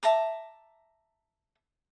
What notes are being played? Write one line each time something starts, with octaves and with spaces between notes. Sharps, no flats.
E5 A5 A#5 D6